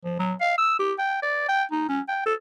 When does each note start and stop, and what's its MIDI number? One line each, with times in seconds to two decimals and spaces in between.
0.05 0.15 53
0.19 0.34 54
0.41 0.56 77
0.58 0.75 88
0.79 0.93 67
0.98 1.18 79
1.22 1.45 74
1.48 1.64 79
1.71 1.87 63
1.89 2.01 61
2.08 2.21 79
2.26 2.34 69